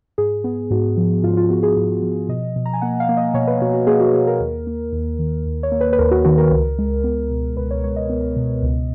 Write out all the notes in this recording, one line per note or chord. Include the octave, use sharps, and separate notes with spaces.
G#2 G#4
B3
G#2 F#4
F3
G#2 F4
F4
B3 F#4
G#4
G#2
F3
B2 D#5
B2
A#5
G#5
A#3 F#5
F5
A#3
D#5
B2 C#5
B4
B2 F#4
F#4
A#3 G#4
F#4
A#3 G#4
A#4
D#2
A#3
D#2
D#3
D#2
C#5
A#3
B4
B4
D#2 A#4
F#4
D#3 F#4
A#4
C#2
G#3
B3
B2
C#2 B4
C#5
G#3 C#5
D#5
B3
B2
C#2